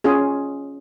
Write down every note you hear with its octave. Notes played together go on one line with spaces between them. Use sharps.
C#4 F4 G#4